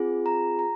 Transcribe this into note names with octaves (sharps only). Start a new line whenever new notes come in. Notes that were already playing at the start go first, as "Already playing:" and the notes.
Already playing: C4 F4 G#4
A#5
A#5